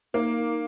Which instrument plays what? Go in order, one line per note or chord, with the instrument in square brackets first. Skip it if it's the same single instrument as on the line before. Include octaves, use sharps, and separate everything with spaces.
[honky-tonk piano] A#3 [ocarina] D#4